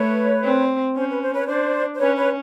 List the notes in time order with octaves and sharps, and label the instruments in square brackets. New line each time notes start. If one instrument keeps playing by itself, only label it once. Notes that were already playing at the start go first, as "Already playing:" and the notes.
Already playing: [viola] A3 [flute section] B4 C#5
[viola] C4
[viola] C#4 [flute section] C5
[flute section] B4
C5
B4 C#5
[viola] D4 [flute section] C5 D5
[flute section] C5
[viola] C#4 [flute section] B4 C#5
[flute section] B4 C#5